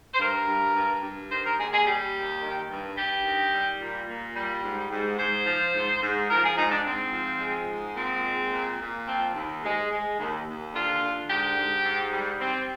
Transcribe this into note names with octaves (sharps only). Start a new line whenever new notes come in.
C5
G2 A#4
G2
G2
G2
D#3 C5
A#4
D#2 G#4
G#4
G3 G4
D#2
D#3
G2
G2 G4
D#3
G3
A#2
A#2
G3
G#2
G#2
G#2 C5
F3
G#2
G#2
F3 A#4
G#4
G#2 D#4
D4
G#2 C4
F3
G#3
G#2
A#2 C4
G#3
A#2
A#2
F3 C4
D#2
G#3
G#3
D#2
D#2
D3 F4
D3
G#2 G4
G#2
G#2
G3
G3 C4